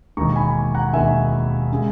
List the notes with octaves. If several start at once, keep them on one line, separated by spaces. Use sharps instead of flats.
E1 D#2 D#3 A#5 C#6
G#5 B5
F#5 A#5
E1 D#2 D#3 E5 G#5
C#3 G#3